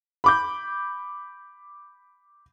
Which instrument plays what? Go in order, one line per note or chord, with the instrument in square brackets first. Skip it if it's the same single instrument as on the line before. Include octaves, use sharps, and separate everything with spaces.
[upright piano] B5 D6 G6